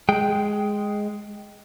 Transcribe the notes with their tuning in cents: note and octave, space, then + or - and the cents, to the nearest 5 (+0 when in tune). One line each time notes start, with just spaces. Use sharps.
G#3 +0 G5 +0